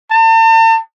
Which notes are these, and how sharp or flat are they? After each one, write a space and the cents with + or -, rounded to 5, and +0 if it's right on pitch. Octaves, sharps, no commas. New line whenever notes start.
A5 +40